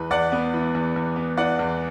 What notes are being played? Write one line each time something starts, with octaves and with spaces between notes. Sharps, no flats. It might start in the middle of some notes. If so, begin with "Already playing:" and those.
Already playing: E2 E3 B4
E2 D5 F#5
B3
E3
E2
E2
B3
E3 D5 F#5
E2